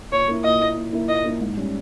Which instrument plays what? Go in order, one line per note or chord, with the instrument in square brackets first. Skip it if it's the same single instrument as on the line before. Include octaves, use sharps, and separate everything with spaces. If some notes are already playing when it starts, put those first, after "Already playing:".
[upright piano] A#2 [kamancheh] C#5
[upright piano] A#3 E4
[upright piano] A#2 [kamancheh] D#5
[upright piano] A#3 E4
A#2
A#3 E4
[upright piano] A#2 [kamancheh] D#5
[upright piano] A#3 E4
G#2
G3 C#4